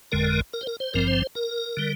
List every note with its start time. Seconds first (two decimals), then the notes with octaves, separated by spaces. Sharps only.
0.12 G1 F2 D3 G#3 A#4
0.53 A#4
0.61 C5
0.67 A#4
0.80 C5
0.94 G#1 G2 F3 C4 A#4
1.07 C5
1.35 A#4
1.77 D3 G3